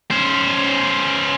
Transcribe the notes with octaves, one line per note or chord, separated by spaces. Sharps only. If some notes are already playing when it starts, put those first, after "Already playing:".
C#4 C5